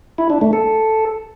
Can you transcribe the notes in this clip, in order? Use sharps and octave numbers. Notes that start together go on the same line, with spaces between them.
E4
D4
A3
A4